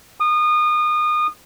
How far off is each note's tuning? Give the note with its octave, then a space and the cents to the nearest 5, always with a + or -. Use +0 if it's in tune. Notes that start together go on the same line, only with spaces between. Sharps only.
D#6 -30